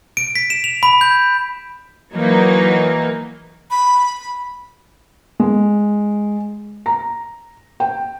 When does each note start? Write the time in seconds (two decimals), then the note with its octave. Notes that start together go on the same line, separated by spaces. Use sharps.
0.17 D7
0.36 B6
0.50 E7
0.64 F7
0.83 B5
1.01 G6
2.12 E3 F#3 A#3 D#4
3.71 B5
5.40 G#3
6.86 A#5
7.80 G5